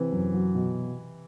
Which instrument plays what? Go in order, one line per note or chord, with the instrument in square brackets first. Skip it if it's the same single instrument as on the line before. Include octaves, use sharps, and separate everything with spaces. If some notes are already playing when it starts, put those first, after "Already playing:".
Already playing: [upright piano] C3 E3 [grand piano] C4
[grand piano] F#2
F#3
B2